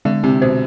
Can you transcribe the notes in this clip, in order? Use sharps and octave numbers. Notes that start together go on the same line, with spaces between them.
D3 G#3
C3 C4
B2 C5